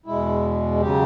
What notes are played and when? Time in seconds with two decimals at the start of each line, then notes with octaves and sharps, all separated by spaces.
0.06 E2 B2 G#3 E4
0.81 C#3 F#3 G4